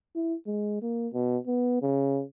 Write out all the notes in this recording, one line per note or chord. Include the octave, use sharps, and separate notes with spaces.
E4
G#3
A#3
B2
B3
C#3